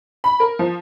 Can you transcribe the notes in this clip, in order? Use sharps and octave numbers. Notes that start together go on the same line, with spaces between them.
B5
A#4
F3